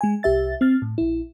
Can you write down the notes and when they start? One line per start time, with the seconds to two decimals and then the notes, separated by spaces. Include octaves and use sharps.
0.01 G#3 G#5
0.23 C2 G4 E5 A6
0.61 C4 F6 A6
0.82 A2
0.98 A#1 E4